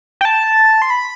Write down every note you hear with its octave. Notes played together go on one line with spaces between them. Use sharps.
G5
A5
C6
B5